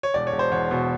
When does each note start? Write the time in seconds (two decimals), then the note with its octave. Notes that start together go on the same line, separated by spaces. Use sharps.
0.03 C#5
0.14 E1 D5
0.27 C#5
0.32 E1
0.39 C5
0.52 E2 C#5
0.71 B2